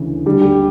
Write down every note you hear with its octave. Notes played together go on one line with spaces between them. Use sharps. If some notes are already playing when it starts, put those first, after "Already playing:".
Already playing: D2 C#3 E3
D2 D3 G3 G4
G3 G4